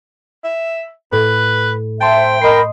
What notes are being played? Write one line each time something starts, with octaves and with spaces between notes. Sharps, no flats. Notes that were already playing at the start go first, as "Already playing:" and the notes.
E5
A2 B4
C5 E5 G5 A5 C6
A#4 D#5 B5 C7